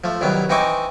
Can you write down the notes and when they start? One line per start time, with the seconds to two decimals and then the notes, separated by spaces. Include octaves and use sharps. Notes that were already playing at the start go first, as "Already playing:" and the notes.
0.04 F3 A3
0.21 C2 D#3 F#3 B3
0.49 E3 C4 D#4 D#5 C#6 D6